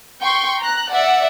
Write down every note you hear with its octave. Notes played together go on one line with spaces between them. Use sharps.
G5 C6 C#6
A#5 F#6
D5 E5 F#5